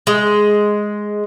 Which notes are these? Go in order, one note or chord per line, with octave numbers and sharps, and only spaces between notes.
G#3